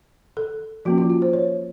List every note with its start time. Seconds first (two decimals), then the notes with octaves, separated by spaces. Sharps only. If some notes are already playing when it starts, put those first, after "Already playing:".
0.37 A4
0.85 F3 A#3 C#4 F#4
0.98 F4
1.10 F4
1.22 C5
1.33 C#5